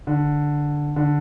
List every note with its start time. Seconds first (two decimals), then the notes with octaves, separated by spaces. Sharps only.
0.07 D3
0.96 D3